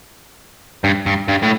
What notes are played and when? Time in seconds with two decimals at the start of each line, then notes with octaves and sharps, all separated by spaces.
0.84 G2
1.06 G2
1.28 G2
1.42 A2